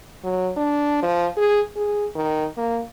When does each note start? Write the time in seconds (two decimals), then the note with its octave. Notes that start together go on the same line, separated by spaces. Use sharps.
0.24 F#3
0.57 D4
1.02 F3
1.37 G#4
1.76 G#4
2.15 D#3
2.57 A#3